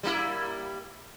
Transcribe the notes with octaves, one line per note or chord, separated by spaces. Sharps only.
G3 A#3 E4